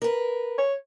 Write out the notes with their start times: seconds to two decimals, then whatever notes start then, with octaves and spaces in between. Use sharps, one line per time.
0.02 A#4 B4
0.58 C#5